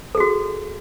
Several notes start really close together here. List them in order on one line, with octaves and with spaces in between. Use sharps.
A4 G#4 F#4